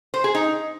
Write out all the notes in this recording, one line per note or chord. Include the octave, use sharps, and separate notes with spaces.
C5
G#4
D#4